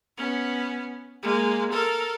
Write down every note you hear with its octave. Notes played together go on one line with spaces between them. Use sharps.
B3 C#4
G#3 A#3
A4 A#4